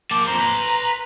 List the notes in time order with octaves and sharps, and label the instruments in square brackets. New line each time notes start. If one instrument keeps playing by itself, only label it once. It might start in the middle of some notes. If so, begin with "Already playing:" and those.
[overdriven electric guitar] A#3 A5 [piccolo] D6
[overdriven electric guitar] F2 C5 [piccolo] A#5
[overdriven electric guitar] B4 C6